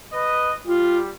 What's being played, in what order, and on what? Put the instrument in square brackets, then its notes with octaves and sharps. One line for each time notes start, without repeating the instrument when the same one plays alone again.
[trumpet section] B4 D#5
[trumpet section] G3 G4 [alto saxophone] F4